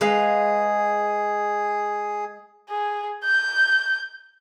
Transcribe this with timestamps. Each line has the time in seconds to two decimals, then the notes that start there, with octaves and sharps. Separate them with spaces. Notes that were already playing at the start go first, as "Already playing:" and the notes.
0.01 G#3 G#4 B4 F5
2.70 G#4
3.25 G6